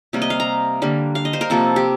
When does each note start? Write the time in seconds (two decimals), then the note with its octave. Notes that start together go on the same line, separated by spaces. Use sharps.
0.13 C3 G3 A#3
0.22 D#5
0.30 F5
0.40 A#5
0.82 D3 G3 A#3
1.15 F5
1.25 D#5
1.33 C5
1.41 A#4
1.50 C3 F3 A#3 A4
1.76 G4